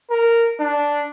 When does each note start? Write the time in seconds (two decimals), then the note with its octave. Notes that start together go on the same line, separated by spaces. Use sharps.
0.11 A#4
0.60 D4